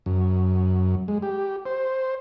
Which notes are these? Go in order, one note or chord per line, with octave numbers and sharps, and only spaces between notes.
F#2
G#3
G4
C5